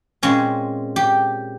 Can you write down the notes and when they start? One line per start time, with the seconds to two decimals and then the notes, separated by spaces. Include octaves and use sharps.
0.23 A#2 G#3 C4 C#4
0.96 G4